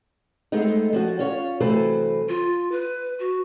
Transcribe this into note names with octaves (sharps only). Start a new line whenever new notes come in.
G#3 A3 B3 C4 D#4
F3 C#4 F#4
C#4 F4 C#5
C3 E3 F#3 A3 B4 C5
F4
B4
F#4